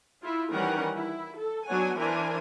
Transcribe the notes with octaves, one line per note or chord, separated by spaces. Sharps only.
E4 F4
D#3 E3 G3 C#4 A#4 F#5
E4
A4
F#3 B3 D4 C#5 F#5 G#5
E3 D4 A#4 C5 G#5